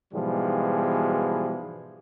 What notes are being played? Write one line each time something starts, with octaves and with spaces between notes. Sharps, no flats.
G#2 B2 E3 F3 G3 G#3